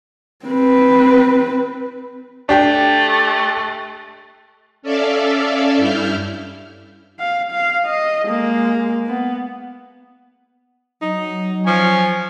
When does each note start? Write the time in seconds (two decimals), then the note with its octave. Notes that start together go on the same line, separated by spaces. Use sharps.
0.46 C4 B4
2.49 A3 D4 G4 G5
4.82 C#4 A4 D5 E5 F5
5.78 G2 E4 F6 G6
7.19 F5
7.51 F5
7.85 D#5
8.25 G#3 A#3
9.06 B3
11.02 F#3 D#4
11.67 F3 G#5 C#6